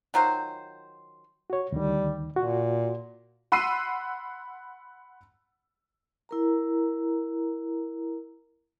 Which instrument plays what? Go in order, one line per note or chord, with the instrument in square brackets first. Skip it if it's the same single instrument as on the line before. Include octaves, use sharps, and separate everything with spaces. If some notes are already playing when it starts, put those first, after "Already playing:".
[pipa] D#3 F#3 F4 C5
[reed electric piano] F#4 C#5
[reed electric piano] D2 D#3 [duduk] G3
[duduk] A#2 [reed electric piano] F#4
[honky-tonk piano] F#5 B5 C6 E6 C7 D#7
[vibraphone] E4 A#4 A#5